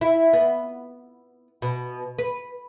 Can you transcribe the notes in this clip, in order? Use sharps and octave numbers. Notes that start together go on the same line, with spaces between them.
E4
B3
B2
B4